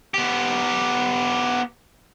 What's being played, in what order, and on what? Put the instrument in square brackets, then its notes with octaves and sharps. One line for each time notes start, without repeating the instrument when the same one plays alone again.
[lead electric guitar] B3 G4